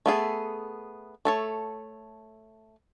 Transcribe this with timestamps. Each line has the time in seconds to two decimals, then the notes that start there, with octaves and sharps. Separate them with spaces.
0.06 A3 B3 G#4 A4
1.25 A3 A4 C#5